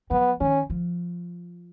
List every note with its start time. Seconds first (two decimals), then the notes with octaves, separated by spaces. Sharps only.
0.10 F#3 B3
0.40 D#3 C#4
0.70 F3